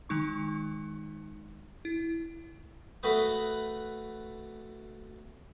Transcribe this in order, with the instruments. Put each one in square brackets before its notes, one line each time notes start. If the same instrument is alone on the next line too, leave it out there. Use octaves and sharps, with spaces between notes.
[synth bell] D#3 G#3 D#4 C#6
E4
[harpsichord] A3 F#4 B4 D#6